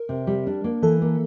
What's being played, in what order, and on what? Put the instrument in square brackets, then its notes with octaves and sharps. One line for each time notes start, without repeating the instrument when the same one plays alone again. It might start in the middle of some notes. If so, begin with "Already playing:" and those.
Already playing: [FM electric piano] A#4
[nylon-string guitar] C3
G3
D4
A#3
[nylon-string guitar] E3 [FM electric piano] A4
[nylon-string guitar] A#3